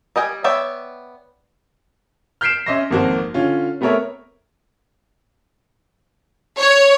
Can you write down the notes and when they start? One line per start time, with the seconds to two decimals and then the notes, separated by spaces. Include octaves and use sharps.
0.16 G3 D#5 G5 G#5
0.44 B3 C#5 D5 E5 G5
2.41 F6 G6 B6 C7 D7 E7
2.66 C#4 D#5 E5 C6 A#6
2.91 G#1 F2 A#3 F#4 C5
3.34 D3 C#4 F4
3.81 A3 B3 C4 A#4 C#5 E5
6.59 C#5